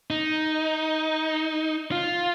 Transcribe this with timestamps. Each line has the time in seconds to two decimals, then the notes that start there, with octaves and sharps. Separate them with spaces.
0.10 D#4
1.92 F4